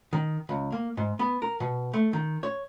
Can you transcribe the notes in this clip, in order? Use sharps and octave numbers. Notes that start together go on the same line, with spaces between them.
D#3
C#2
A#3
G#2
B3
A#4
B2
A3
D#3
C#5